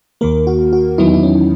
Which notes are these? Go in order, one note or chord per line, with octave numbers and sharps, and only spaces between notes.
D#2 D#3 A#3 A#4
F#4
F#4
E2 D#3 F#3 B3 E4
D#4
E4
C#4